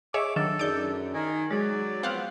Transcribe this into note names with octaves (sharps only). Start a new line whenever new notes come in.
G#4 C#5 D#5 E5 D6
D#3 F#3 D4 A4
F#2 D#4 G#4 D5 D6 G6
D#3 G#5
F#3 G#3 G#4 D5
F3 B3 C4 F5 F#5